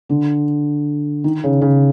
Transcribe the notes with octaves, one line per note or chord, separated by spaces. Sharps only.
D3
D#3
C#3
C#3